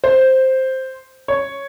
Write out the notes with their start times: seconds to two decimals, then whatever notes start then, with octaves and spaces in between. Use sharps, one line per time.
0.04 C5
1.28 C#5